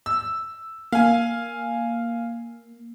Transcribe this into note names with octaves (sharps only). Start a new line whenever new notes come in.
E6
A#3 F5 G#5